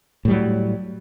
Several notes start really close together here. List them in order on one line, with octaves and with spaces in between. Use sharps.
A2 G3 F#3